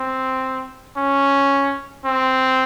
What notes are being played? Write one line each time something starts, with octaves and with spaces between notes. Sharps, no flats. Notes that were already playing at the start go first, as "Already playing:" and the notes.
Already playing: C4
C#4
C4